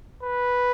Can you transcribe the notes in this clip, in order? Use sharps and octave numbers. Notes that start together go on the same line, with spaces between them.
B4